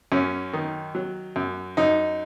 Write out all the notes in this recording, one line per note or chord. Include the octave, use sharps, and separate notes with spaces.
F#2 C#4
D#3
F#3
F#2
F#2 D#4